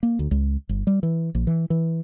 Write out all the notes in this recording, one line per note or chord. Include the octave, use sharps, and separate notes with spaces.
A#3
D2
C#2
G1
G3
E3
A#1
E3
E3